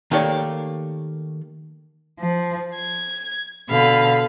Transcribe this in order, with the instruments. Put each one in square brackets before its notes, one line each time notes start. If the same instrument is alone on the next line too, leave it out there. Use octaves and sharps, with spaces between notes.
[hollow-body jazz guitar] D#3 A3 A#3 G4 C#5 D5
[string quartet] F3
G#6
B2 D3 F5 B5